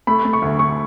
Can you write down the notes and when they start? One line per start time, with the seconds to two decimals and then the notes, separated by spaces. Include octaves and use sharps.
0.07 A3 B5
0.25 A3
0.33 C#6
0.42 D2
0.59 D2 C#6